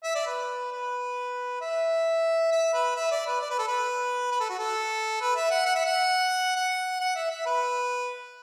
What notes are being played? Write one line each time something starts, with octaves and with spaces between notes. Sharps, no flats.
E5
D5
B4
B4
E5
E5
B4
E5
D5
B4
D5
B4
A4
B4
B4
A4
F#4
A4
B4
E5
F#5
F#5
E5
F#5
F#5
F#5
E5
E5
B4